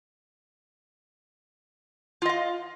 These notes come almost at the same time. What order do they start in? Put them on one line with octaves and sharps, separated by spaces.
F4 D#5 F5